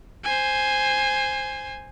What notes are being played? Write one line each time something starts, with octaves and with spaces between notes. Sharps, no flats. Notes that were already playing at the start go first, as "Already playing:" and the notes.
C5 G#5